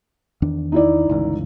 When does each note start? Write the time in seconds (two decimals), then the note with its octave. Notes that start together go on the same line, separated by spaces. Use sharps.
0.42 E2 D#3 D4
0.72 D#4 E4 D5
1.09 G1 C#2 E3